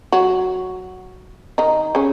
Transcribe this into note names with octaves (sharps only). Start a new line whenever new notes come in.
F#3 F#4
D#3 D#4
C#3 C#4